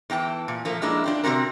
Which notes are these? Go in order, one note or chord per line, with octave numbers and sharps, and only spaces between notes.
E2 E3 G5 A5
A#2
F3 A3 A#3
F3 G#3 A#3 D4 E4
D4 F4 G4
C3 G#3 C4 F#4 A#4